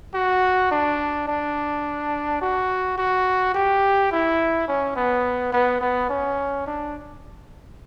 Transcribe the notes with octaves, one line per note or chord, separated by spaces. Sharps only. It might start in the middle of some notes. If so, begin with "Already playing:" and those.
F#4
D4
D4
F#4
F#4
G4
E4
C#4
B3
B3
B3
C#4
D4